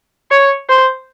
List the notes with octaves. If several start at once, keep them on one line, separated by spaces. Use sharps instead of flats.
C#5
C5